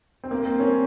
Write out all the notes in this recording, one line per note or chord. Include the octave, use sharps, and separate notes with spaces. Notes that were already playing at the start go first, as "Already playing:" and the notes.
C4
A#3
C4
C#4